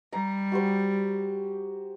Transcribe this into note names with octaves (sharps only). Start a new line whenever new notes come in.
G3 A#5
F#4 G4 C5